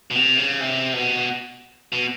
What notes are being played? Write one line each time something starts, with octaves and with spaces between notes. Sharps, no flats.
B2
C3
C#3
C3
B2
B2